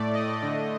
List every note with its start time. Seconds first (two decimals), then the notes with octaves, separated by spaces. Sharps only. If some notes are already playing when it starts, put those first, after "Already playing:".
Already playing: A2 A3 D5
0.14 D#5
0.42 D3 A3